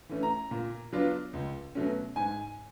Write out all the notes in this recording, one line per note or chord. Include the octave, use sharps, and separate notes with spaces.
E3 A3 C#4
A#5
A#2
F#3 B3 D4 F4
C#2
B2 F#3 A3 C#4
G#2 G#5